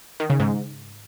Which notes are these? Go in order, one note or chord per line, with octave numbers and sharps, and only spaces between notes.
D#3
C#3
G#2